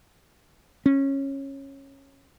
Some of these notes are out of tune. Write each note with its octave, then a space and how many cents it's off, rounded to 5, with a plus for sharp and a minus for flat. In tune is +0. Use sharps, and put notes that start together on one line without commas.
C#4 -15